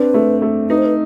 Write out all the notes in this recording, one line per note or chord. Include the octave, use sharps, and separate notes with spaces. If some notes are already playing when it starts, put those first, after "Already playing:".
Already playing: C4 D4 B4
A3
A3
D#4 B4
C5
B4